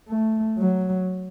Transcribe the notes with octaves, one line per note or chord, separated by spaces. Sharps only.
A3
F#3